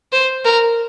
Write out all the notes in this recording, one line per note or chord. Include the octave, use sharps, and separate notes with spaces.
C5
A#4